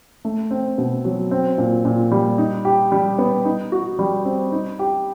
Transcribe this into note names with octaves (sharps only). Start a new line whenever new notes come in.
A3
C4
B2
F#3
C4
A#2
A#2
G3
D#4
G4
G3
B3
D#4
F#4
G3
C4
D#4
G4